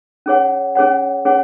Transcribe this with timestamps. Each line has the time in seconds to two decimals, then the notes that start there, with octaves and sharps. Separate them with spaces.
0.26 C#4 G#4 C#5 F#5
0.75 C#4 G#4 C#5 F#5
1.25 C#4 G#4 C#5 F#5